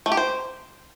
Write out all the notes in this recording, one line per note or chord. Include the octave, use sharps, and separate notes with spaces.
A3
G4
C5